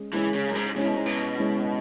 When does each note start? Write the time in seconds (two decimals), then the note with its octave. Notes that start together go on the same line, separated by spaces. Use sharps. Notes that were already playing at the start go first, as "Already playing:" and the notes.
Already playing: G#3 C#4 G#4
0.13 E3 G#3 C#4 G#4
0.34 C#3
0.48 F#2
0.55 G#2
0.76 C#3 G#3 C#4 E4
0.86 B2
0.96 G#2
1.06 B2
1.38 G#3 C#4 E4